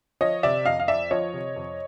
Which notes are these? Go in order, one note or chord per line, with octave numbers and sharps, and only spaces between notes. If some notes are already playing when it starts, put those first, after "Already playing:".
F3 C#5 D#5
C3 D5 E5
F2 D#5 F5
F5
F2 D5 E5
F3 C#5 D#5
C3
F2